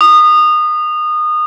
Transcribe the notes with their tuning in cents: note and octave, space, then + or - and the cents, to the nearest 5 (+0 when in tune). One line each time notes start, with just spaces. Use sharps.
D#6 -25